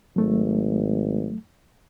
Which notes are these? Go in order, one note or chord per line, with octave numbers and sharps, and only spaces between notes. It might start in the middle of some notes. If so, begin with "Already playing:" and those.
G#1 F#3 A3